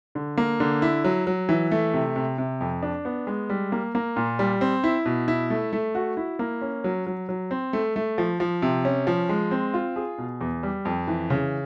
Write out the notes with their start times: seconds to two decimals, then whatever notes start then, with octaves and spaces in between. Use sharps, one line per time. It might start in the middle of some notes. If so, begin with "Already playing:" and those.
0.15 D3
0.37 A#3
0.60 D3
0.82 E4
1.04 F#3
1.27 F#3
1.49 E3
1.71 A3
1.94 C3
2.16 C3
2.38 C3
2.61 F2
2.83 D4
3.05 B3
3.27 G#3
3.50 G3
3.72 A#3
3.95 A#3
4.16 A#2
4.39 G3
4.61 C4
4.84 E4
5.06 B2
5.28 E4
5.50 A3
5.73 A3
5.95 F#4
6.17 E4
6.39 A#3
6.62 C#4
6.84 F#3
7.07 F#3
7.29 F#3
7.51 C4
7.73 A3
7.96 A3
8.18 F3
8.40 F3
8.62 C3
8.85 C#4
9.07 F3
9.29 G#3
9.51 C4
9.74 F4
9.96 G#4
10.18 B2
10.41 E2
10.63 G3
10.85 F2
11.08 E3
11.30 C#3